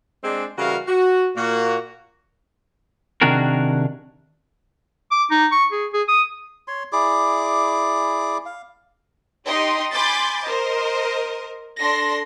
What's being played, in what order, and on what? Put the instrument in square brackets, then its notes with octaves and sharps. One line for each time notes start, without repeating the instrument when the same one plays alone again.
[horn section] G#3 C4 D4
C#3 E3 G3 F#4 A#4 F5
F#4
A#2 A#3 F#4
[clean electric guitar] C3 D#3 D4 F#4 G#4 A#4
[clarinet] D6
D#4
C#6
G#4
G#4
D#6
[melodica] C#5 C6
E4 G#4 D5 D6
F5
[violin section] D#4 G4 D#5 G5 C6
G#5 B5 C6 D6 G6 A6
A#4 C5 D#5
D4 A4 C6 A#6